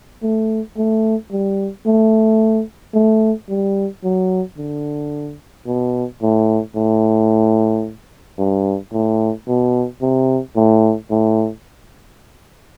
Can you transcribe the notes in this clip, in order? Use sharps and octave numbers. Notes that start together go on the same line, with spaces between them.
A3
A3
G3
A3
A3
G3
F#3
D3
B2
A2
A2
G2
A2
B2
C3
A2
A2